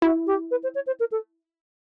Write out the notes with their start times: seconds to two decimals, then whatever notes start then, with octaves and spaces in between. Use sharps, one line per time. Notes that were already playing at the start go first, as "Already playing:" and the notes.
0.02 E4 F#4
0.26 G4
0.51 B4
0.63 C5
0.74 C#5
0.86 C5
0.99 A#4
1.11 A4